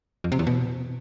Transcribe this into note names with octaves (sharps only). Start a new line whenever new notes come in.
F2
C3
E2
B2